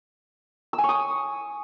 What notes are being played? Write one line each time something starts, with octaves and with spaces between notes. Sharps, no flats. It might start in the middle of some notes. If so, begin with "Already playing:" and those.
E6
G#5
C#6
D#6